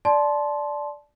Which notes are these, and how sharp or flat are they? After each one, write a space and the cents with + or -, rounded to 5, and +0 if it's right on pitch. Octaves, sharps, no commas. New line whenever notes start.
D5 +0 A5 -20 C6 +0